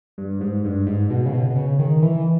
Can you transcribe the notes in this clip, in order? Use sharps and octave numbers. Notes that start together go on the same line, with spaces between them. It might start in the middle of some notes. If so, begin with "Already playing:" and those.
G2
G#2
G2
G#2
B2
C#3
B2
B2
C#3
D#3
E3